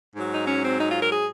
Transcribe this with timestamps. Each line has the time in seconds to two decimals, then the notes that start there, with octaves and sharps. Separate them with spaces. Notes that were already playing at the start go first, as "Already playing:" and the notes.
0.16 G#2 F#3
0.32 D#4
0.47 C#4
0.63 C4
0.79 D#4
0.89 F4
1.00 A#4
1.10 G#4